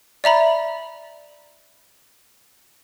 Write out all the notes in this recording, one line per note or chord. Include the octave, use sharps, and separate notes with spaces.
D5 E5 A#5 B5